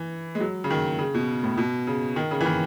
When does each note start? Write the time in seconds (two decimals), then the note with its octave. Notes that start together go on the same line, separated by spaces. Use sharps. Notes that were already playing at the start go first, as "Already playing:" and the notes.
Already playing: E3
0.35 G#3
0.40 F#3
0.64 C#3
0.70 D#3
0.99 C#3
1.14 B2
1.43 A2
1.58 B2
1.87 C#3
2.16 D#3
2.31 C#3
2.41 E3
2.46 D#3